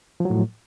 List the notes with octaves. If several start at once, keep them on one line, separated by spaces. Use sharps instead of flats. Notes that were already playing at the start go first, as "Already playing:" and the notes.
A2 F3 F#3